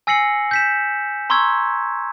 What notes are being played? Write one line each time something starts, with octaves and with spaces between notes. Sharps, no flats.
G#5 E6 A#6 C7 C#7 F#7
G6 B6 E7
A#5 C6 C#6 E6 G#6